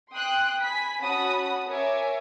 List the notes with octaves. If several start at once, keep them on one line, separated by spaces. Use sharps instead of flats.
G5 C6 D#6 F#6
G#5 B5 B6
C#4 F#4 A5 B5 D#6
A#4 C#5 E5 G#5 D6